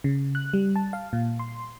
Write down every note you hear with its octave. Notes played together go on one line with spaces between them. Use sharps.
C#3
F#6
G3
A5
F5
A#2
C6